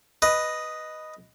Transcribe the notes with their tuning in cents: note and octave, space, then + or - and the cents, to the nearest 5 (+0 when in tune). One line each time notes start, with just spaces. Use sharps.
B4 +0 D#5 +0